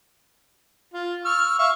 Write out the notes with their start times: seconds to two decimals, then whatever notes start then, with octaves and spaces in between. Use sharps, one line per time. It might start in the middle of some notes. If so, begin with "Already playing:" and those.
0.94 F4
1.25 C#6 E6 F6
1.59 E5 F5 C#6